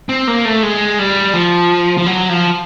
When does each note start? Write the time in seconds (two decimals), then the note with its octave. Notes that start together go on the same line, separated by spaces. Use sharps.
0.09 C4
0.27 A#3
0.45 A3
0.63 G#3
0.99 G3
1.34 F3
1.98 F3
2.06 F#3
2.29 F3